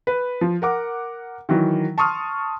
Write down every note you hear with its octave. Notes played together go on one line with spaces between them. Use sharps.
B4
F3
A#4 F#5 D6
D#3 E3 F#3
A5 C6 C#6 D#6 F6